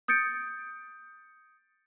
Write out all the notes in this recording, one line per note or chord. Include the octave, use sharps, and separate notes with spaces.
D#6 G6 A6 C#7 D7